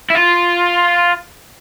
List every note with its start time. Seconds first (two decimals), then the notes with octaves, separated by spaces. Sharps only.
0.10 E4
0.15 F4